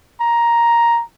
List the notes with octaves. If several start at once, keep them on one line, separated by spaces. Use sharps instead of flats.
A#5